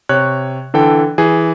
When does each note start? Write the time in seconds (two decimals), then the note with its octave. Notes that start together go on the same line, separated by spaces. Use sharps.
0.09 C3 C#5 F#6
0.74 D3 E3 A4 G5
1.18 E3 G#4